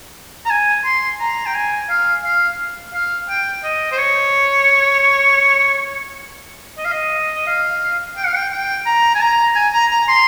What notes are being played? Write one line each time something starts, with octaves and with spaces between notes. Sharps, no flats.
A#5
G#5
C6
A#5
G5
G#5
F5
F5
F5
G5
D#5
C5
C#5
D#5
F5
D#5
D#5
F5
G5
F5
G5
G5
A#5
G#5
A#5
G#5
A#5
A#5
C6